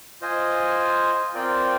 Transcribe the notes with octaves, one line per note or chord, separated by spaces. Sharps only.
F4 C5 D#5 G#5
C4 F4 A#4 D5 G5